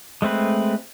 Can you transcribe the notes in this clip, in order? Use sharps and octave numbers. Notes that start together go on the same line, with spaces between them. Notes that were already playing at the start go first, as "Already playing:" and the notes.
G#3 A3 C4 B4